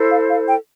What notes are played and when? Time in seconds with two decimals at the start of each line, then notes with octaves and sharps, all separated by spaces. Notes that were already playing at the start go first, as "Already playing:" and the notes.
Already playing: E4 A4 C5
0.09 F5
0.30 F5
0.48 G5